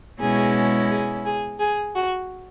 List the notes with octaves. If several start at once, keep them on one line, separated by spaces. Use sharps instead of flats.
B2 G#3 C#4 E4 G#4
G#4
G#4
G#4
F#4